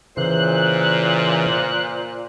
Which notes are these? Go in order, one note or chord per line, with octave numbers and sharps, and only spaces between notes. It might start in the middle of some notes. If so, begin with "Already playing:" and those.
A#2 C#3 E3 C5 F#6